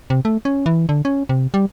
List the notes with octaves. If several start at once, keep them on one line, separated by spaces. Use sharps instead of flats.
C3
A3
C#4
E3
D3
C#4
C3
G3